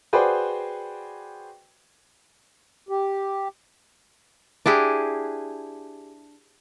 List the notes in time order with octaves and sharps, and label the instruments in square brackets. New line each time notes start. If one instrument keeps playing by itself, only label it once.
[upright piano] F#4 G#4 B4 C5 D5 G5
[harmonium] G4
[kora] D4 E4 G4 G#4